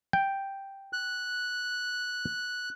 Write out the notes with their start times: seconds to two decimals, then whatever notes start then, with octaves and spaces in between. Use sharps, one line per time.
0.13 G5
0.93 F#6